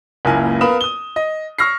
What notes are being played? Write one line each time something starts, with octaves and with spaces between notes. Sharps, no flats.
F#1 C#2 A#3 E4 G#5
B3 A#4 F5 B5 D#6 E7
D#6 G7
D#5
C#6 E6 F6 A#6 C7